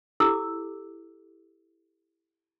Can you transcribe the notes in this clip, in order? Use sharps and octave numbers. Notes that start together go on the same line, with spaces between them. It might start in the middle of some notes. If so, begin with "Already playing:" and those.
E4 G4 A4 D6 E6